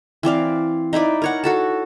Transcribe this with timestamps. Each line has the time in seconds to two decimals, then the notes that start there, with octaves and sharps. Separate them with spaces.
0.23 E3 C4 D5 F5
0.93 D#4 E4 B4 D5
1.22 A#4 C#5 F#5
1.44 F#4 A4 A5